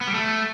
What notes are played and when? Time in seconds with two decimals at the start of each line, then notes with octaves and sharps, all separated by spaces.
0.01 B3
0.08 G3
0.14 A3